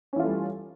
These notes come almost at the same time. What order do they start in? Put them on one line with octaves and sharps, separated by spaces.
C#4 E3 F4 A3 G3